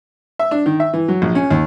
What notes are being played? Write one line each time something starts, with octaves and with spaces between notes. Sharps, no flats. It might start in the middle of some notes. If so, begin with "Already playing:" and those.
E5
D4
D#3
E5
E3
F#3
A#1
C#4
D#2